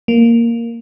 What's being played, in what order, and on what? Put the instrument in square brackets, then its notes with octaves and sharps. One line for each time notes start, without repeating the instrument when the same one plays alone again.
[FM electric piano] A#3